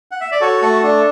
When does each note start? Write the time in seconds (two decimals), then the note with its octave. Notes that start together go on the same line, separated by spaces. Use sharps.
0.11 F#5
0.21 E5
0.31 D5
0.41 F#4 A4 C#5
0.61 A3 A4
0.83 D4 A4